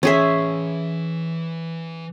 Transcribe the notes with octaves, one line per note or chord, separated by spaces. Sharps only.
E3 C#4 G#4 E5 C6